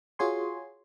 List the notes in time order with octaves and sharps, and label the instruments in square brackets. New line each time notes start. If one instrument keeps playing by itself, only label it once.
[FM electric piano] F4 F#4 G#4 C#5 G#5 C6